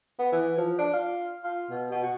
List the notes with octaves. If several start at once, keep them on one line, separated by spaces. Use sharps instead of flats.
B3
E3
F3
D4
F4
F4
B2
B2
F#4